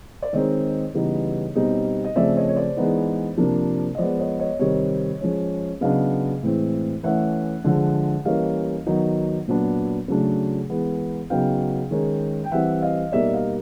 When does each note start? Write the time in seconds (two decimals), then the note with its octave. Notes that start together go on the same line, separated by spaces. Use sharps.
0.22 D5
0.33 D#3 G#3 C4 D#4 C#5 D#5
0.94 C#3 E3 G3 B3 D#4
1.55 B2 G3 C4 D#4
2.04 D#5
2.16 C#3 F3 A3 C4 D5 E5
2.37 C#5 D#5
2.48 C#5
2.56 C5 D5
2.77 E3 G#3 B3 D#4
3.38 C3 F3 A#3 D4
3.95 D#5
3.98 F3 G#3 B3 C5 D5
4.19 C#5 D#5
4.40 C#5 D#5
4.59 C3 D#3 G3 C4 C#5 D#5
5.21 F3 G#3 C#4
5.81 C#3 F#3 B3 D4 D#5 F5
6.43 A2 E3 G#3 C4
7.03 E3 A3 C#4 E5 F#5
7.64 D3 F3 G#3
8.25 E3 G3 A#3 C#4 D#5 F5
8.86 D#3 F#3 B3 D#4
9.48 A#2 F#3 B3 D4
10.08 C#3 F#3 A3 D4
10.70 E3 G#3 B3
11.30 C#3 F#3 B3 D#4 F5 G5
11.91 D#3 G#3 C#4
12.44 G5
12.52 E3 G3 C4 E5 F#5
12.82 D#5 F5
13.12 B2 G3 A#3 D#4 D5 E5
13.34 D#5 F5